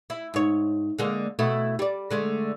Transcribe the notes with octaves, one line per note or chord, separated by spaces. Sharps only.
E4
G#2 C#5
D3 G#3 A#3
B2 A3 E4
G3 D5
D3 G#3 A3